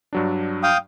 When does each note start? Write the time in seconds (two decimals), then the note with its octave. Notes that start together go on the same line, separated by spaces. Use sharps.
0.13 G2 F#3 D4
0.63 F5 G5 D#6